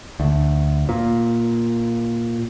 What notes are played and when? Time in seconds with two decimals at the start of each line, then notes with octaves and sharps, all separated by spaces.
0.20 D2
0.89 A#2